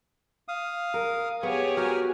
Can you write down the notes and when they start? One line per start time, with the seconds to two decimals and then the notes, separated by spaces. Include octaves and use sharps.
0.48 F5 D#6
0.94 A#4
1.43 B3 G4 G#4 C#5
1.77 F#4 A#4 G#5